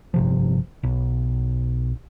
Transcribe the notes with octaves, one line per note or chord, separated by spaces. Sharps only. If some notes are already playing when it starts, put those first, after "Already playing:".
G1 C3 F3
B1